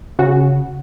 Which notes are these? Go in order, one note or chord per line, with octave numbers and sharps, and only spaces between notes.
C#3 F#4